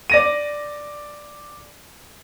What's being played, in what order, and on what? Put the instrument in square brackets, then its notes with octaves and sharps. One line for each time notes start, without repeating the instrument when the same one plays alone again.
[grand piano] D5 A#6 D#7